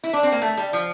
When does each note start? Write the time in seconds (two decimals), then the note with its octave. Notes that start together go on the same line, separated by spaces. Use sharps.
0.04 E4
0.13 D4
0.23 C4
0.32 A#3
0.42 A3
0.57 G3
0.73 F3